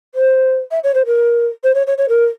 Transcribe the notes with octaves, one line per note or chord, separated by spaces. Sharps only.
C5
E5
C#5
C5
A#4
C5
C#5
C#5
C#5
A#4